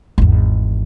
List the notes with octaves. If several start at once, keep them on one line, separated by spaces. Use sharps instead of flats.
G#1 E2